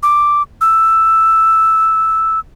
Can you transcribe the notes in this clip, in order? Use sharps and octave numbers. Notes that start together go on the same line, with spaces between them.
D6
E6